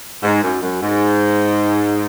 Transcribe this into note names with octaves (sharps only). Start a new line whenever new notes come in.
G#2
F#2
F#2
G#2